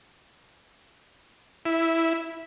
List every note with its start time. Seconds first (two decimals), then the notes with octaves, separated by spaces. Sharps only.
1.65 E4